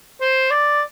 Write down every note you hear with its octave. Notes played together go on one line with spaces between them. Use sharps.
C5
D5